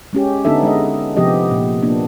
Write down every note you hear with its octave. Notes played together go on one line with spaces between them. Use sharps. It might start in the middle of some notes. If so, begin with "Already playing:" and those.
G#3 C#4 G4
D3 B3 D4 D#4 A4 E5
G#3 D#5
C3 F3 B3 G4 D#5
A#2
A#3 B3 D4